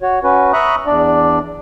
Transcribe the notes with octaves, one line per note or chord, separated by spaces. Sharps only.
F#4 C#5
C#4 F#4 B4
E5 A#5 B5 C#6 D#6 F#6
E2 D4 D5